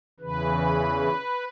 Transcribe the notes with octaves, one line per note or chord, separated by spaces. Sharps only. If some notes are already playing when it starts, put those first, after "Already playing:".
E2 C#3 E3 B4